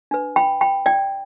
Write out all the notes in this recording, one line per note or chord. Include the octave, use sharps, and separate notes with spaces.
D4 B4
G5 B5
G5 B5
D5 G5